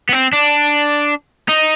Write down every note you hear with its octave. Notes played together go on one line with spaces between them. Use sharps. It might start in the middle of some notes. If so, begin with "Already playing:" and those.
B3
C4
D4
D#4